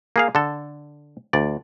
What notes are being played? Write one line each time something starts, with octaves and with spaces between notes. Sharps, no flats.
A#3 G#4 F5
D3 A4
D2 D5